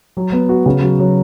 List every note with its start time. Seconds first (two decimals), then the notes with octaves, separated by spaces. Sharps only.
0.17 F#3
0.32 B3
0.49 F#4
0.66 C#3
0.82 F#3
0.99 F#3